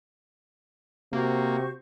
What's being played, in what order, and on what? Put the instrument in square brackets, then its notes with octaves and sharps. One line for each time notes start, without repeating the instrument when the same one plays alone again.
[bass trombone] C3 [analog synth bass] A#3 [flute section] F#4 C5 C#6